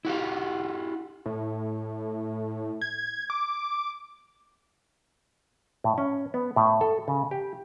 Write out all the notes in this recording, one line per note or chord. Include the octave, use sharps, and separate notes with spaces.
E4 F#4 G4 F5
A2
G#6
D6
A2
C#4
B3
A2
A4
C#3
G4